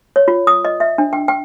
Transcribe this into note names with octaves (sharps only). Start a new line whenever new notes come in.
C#5
F4
D#6
D#5
E5
D4
G5
G5